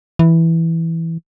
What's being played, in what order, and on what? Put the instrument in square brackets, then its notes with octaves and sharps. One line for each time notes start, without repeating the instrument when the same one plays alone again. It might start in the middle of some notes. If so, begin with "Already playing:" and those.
[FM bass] E3